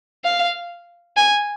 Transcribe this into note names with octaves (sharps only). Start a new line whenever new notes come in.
F5
G#5